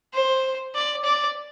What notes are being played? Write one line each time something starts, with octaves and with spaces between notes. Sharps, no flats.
C5
D5
D5